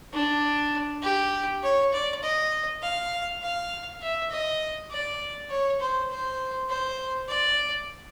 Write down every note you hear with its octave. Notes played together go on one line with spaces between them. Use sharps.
D4
G4
C#5
D5
D#5
F5
F5
E5
D#5
D5
C#5
C5
C5
C5
D5